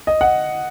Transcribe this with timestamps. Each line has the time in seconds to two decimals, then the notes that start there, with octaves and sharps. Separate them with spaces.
0.07 D#5
0.21 F#5